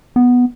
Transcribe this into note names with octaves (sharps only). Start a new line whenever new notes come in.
B3